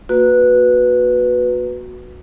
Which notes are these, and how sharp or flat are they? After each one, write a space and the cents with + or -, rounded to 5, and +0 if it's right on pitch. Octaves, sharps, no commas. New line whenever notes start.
A#3 +0 F#4 -10 B4 +0